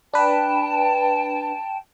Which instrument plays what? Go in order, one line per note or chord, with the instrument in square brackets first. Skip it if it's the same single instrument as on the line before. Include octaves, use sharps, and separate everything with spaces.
[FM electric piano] D4 B4 [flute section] G5 A5